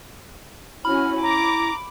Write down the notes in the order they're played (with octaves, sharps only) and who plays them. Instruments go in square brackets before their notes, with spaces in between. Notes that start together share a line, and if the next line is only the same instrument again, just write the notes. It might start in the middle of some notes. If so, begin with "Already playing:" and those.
[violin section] C#4 F#4 [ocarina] E4 [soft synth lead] B5 [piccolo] F6
[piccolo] A#5 [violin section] D6